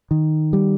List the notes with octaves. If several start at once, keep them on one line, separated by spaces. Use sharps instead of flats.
D#3
G3